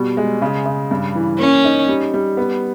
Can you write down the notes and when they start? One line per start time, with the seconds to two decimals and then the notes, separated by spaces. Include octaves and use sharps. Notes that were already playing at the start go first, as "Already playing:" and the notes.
Already playing: B2 G3
0.17 G#3
0.42 C#3
0.66 C#3
0.91 G2
1.15 E3
1.39 A#3 C#4
1.64 D#4
1.89 G3
2.14 G3
2.37 B3